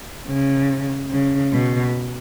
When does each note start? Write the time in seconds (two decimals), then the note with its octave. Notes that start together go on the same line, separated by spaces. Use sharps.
0.27 C#3
1.11 C#3
1.52 B2